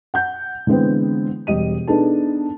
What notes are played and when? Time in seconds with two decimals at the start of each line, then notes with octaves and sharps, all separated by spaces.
0.14 F#5 G6
0.67 D3 E3 G#3 B3 C4
1.47 E1 G3 D#5 D#7
1.88 B3 D4 D#4 G#4 A4 A5